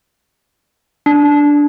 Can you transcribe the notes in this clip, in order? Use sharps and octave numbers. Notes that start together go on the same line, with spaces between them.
D4